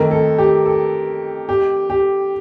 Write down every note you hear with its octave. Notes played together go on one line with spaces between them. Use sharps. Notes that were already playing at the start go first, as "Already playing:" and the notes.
Already playing: F2 D#3 A3 A#4
A4
G4
A4
G4
G4